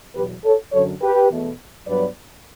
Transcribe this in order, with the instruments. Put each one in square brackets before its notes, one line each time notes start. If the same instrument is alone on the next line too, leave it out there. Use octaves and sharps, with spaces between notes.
[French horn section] E2 B2 F#3 G4 B4
A4 C#5
F#2 D3 F#3 A4 C#5
G4 B4
E2 B2 A3
G2 F#3 B3 B4 D5